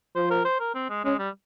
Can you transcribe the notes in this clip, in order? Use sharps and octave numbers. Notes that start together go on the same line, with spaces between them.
F3 C5
A#4
C5
A#4
C4
G#3
G#3 C#4
G3